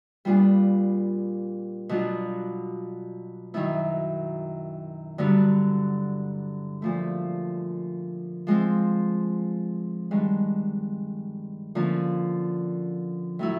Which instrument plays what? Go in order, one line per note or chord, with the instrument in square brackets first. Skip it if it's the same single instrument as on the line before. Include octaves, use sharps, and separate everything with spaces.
[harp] A#2 G3 B3 D4 F4
B2 F#3 B3 D4 F4
F#2 D#3 F#3 B3 E4
G2 D3 F#3 B3
A#2 F3 A3
F3 G#3 C4
G2 D#3 G#3
D3 F3 A#3 C#4
A2 F#3 B3 E4